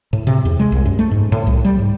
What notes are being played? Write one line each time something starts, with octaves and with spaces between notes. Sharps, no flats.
A2
C3
E2
G#3
C2
F#2
A3
G#2
A2
C2
G3
G#2